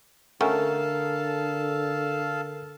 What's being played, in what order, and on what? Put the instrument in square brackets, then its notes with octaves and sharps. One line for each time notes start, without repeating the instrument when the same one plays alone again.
[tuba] D3 [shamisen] A3 C#4 F#4 [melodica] A4 F5 A5 [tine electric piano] A#4